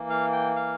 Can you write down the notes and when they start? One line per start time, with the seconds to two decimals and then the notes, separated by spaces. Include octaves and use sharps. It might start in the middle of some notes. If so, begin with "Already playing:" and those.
Already playing: E3 A#3
0.10 F5
0.33 G5
0.56 F5